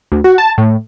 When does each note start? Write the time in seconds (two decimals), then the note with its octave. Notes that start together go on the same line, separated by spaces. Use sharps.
0.12 D2
0.24 F#4
0.38 A5
0.58 A2